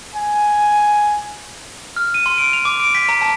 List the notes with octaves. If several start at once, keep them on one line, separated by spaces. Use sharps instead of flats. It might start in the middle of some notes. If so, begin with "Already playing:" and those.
G#5
F6
D#7
C6
D7
F7
D6
D7
B6
A#5
A5